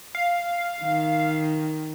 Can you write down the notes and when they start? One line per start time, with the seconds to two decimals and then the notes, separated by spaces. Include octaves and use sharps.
0.15 F5
0.82 D#3